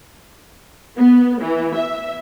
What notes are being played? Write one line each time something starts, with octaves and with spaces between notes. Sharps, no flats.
B3
E3
E5